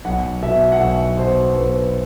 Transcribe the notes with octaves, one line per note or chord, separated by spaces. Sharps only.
B1 F#5
B2 E5
F#5
B1 E5
B2 C5
B1 B4
C5
B4